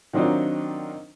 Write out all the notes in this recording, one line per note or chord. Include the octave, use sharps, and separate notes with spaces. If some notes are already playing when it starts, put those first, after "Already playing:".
D#3 F#3 C4 D4 D#4 F4